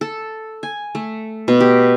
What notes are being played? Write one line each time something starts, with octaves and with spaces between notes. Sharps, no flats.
A4
G#5
A3
B2
G4